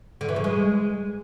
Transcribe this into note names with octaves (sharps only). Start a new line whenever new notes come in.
D3
E3
C#3
G#3